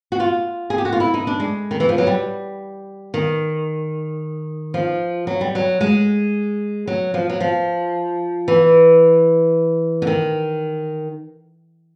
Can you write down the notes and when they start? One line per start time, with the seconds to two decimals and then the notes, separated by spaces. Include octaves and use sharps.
0.12 F#4
0.20 F4
0.70 G#4
0.78 G4
0.85 F#4
0.92 F4
1.00 E4
1.14 D#4
1.27 D4
1.40 G#3
1.71 D#3
1.80 E3
1.89 F3
1.98 F#3
2.07 G3
3.14 D#3
4.74 F3
5.27 F#3
5.41 G3
5.55 F#3
5.81 G#3
6.87 F#3
7.14 F3
7.30 F#3
7.40 F3
8.48 E3
10.02 D3
10.07 D#3